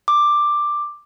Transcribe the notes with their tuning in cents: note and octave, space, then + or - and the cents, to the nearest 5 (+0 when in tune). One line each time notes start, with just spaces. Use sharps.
D6 +10